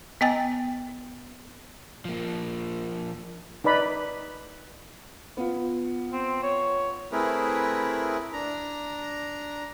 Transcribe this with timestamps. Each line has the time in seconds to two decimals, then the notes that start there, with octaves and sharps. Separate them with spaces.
0.21 B3 D#5 G5 G#5 A6
2.05 F3 A#3
3.64 D#4 B4 D5 B5
5.37 B3 F4
6.12 C4
6.43 C#5
7.12 A3 C4 E4 G#4 A#4 B4
8.33 D4 A#5